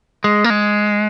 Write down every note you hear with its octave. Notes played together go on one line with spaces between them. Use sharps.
G#3
A#3
G#3